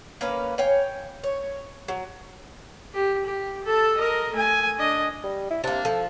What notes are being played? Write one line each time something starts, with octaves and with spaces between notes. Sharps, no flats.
A#3 C#4 B4 F5
C#5 F5 G5 G#5
C#5
F#3
G4
G4
A4 A5
A#4 D#5
A3 G#5
D4 D#5
G3
E4
C3 A#3 D4
F3 A4